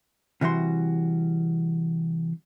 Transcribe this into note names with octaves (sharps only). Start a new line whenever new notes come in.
C3 E3 G3 F#4 C6